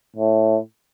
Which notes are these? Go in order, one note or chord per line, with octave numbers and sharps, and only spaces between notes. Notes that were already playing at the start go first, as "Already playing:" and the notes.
A2